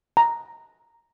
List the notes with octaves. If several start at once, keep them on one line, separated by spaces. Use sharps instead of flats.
A#5